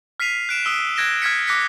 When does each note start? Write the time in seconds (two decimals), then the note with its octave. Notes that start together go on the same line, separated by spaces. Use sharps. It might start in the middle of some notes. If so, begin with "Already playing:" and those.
0.20 F6 B6 C7 D#7 F7
0.49 F#6 D7 E7
0.65 D#6 E6 G7
0.96 F#6 G#6 A#6 D7 E7 G7
1.22 F6 G#6 B6 C#7
1.47 D6 F#6 A#6 B6 C#7